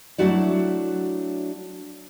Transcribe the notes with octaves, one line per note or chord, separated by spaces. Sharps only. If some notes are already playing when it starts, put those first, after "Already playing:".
F#3 A3 D4 E4 F#4 D5